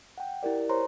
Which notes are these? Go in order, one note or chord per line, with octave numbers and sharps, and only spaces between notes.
F#5 G5
E4 G4 A#4 D5
C5 C#5 A#5 C6